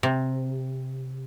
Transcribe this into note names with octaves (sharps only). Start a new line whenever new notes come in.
C3